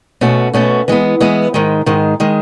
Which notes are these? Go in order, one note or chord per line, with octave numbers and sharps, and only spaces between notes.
B2 A3 C#4 F#4
B2 A3 C#4 F#4
E3 G#3 B3
E3 G#3 B3
G#2 D#3 G#3
G#2 D#3 G#3
D#3 G#3